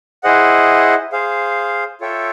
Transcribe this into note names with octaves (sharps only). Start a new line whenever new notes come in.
E4 G#4 C5 D#5 F#5
G#4 C5 F5
F4 A4 C#5 E5 G5